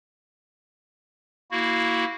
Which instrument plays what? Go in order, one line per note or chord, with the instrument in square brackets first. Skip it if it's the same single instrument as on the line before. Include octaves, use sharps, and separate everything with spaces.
[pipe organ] A#3 E4 F#4